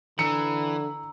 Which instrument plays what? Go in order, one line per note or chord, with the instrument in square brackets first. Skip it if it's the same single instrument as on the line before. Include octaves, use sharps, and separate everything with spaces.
[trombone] D3 [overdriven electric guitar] E3 [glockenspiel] A#5 E6 [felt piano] C#7